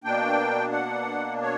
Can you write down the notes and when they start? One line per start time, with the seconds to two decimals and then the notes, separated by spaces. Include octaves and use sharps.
0.04 B2 A#3 D4 G5
0.72 F#5
1.42 C#5